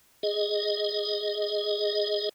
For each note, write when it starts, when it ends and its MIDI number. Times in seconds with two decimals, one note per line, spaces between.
0.23 2.29 68
0.23 2.29 75